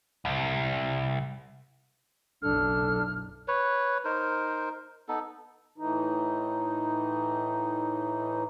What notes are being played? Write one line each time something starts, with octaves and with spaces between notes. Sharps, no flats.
C2
F#1 B1 D4 A4 F6
B4 C#5
D#4 A#4 C5
B3 D#4 A4
A2 E3 D#4